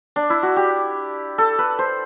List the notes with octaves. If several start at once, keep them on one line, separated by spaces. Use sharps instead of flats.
D4
E4
F#4
G4
A4
B4
C5